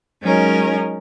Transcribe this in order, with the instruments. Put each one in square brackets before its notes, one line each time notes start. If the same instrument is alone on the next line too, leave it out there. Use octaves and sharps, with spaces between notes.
[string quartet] F#3 G#3 C#4 D#4 A#4 C#5